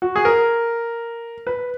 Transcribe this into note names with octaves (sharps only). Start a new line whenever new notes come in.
F#4
G#4
A#4
B4